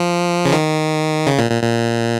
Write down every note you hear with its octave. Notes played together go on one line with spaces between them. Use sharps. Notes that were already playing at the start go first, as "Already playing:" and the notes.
Already playing: F3
C#3
D#3
C#3
A#2
A#2
A#2